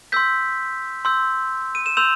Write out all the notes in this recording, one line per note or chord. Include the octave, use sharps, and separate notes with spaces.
C6 E6 G6 B6
C6 E6 G6
D#7
E7
C6 E6 G6 F7